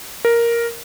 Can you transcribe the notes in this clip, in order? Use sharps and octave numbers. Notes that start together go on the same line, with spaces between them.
A#4